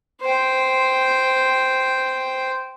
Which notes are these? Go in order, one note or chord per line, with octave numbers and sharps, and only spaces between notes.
C5 G5